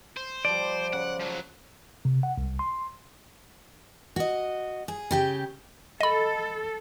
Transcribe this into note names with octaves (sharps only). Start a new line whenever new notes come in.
C5
F3 G3 D5
C#3 F#5
F3 F#3
C3
F#5
C2
C6
F#4 D#5
G#4
C#3 G4 G5
A4 D#5 B5